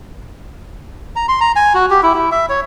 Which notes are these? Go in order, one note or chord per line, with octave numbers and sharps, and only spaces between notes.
A#5
C6
A#5
G#5
F#4
G4
E4
E4
E5
C#5